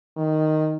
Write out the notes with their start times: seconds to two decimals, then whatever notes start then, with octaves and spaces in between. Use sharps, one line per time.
0.17 D#3